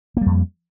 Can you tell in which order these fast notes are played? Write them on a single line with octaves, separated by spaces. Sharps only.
A#3 G3 F2